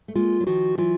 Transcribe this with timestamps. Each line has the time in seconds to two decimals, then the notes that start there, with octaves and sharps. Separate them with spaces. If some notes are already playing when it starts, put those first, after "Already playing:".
0.08 A3
0.15 G#3 A#3 F4
0.40 F#3
0.47 D#3 F3 F#4
0.78 E3 F#3 F4